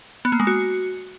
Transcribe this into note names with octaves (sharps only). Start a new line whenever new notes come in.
B3
A#3
G#3
F#4